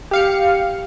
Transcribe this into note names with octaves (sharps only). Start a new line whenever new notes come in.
G4 F5 C#7